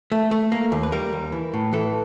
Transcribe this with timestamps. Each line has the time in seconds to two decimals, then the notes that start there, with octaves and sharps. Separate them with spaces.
0.12 A3
0.31 A3
0.52 A#3
0.72 D#2
0.83 B4
0.92 G3 A#4
1.13 D#2
1.32 E3
1.54 A2
1.73 E3 A4